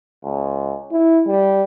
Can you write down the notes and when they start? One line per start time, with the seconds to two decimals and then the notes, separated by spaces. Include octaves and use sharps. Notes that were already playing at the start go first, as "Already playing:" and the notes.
0.24 C#2
0.91 E4
1.27 G3